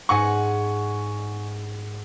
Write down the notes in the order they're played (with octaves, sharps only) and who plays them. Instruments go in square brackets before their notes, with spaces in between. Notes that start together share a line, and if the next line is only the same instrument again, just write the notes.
[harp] G#2 D#5 F#5 [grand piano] G#5 C#6